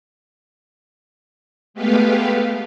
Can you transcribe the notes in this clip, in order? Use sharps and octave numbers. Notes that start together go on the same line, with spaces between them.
G#3 A3 B3 G4 B4 F5